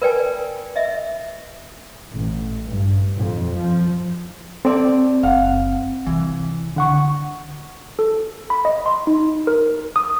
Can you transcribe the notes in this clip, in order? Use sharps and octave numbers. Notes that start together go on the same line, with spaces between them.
A#4 B4 D5 G5 G#5
D#5 E5
A1
G2
F2
F3
C4 A4 D5
F#1 F5 F#5
C2 E3
D3 F#5 C#6
A4
B5
D#5
C6
D#4
A#4
D#6